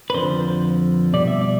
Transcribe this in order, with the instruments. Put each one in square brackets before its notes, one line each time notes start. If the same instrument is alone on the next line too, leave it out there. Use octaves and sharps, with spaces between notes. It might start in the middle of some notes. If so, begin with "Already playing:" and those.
[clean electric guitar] B4
F2 D3 F3 C5
B2 G3 D5
E5
D5